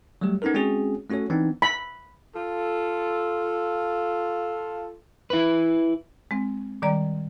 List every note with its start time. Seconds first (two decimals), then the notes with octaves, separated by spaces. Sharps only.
0.21 F#3 G3 A3 G4
0.42 B3 C#4 D#4 A4 A#4
0.54 G#3 C4 C#4 F#4 G#4
1.09 A3 C#4 F#4 A4 C#5
1.30 E3 B3 C4 D4 D#4
1.62 B5
2.36 F4 A4
5.30 E4 B4
6.31 G#3 C4
6.82 A#2 D#3 G3 D5 A#5